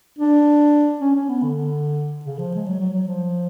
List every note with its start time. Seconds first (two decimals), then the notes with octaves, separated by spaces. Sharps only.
0.19 D4
1.01 C#4
1.15 C#4
1.29 B3
1.43 D3
2.25 C#3
2.38 F3
2.55 G#3
2.66 F#3
2.79 F#3
2.93 F#3
3.07 F3